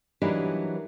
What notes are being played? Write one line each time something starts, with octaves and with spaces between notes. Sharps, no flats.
E3 F#3 G3 D4 D#4 A#4